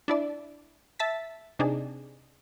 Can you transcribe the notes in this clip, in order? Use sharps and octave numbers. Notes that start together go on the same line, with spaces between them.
D4 E4 D5
E5 A5 A6 B6
C3 D4 D#4 G#4